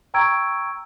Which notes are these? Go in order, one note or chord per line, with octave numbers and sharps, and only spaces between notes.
G5 A#5 C#6 E6 G#6 D7